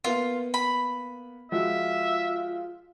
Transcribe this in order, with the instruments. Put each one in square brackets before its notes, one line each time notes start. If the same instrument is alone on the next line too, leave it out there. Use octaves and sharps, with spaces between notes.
[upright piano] A#3 B3 [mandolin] F4
[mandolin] B5
[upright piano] F3 G#3 F#4 [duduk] F4 [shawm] E5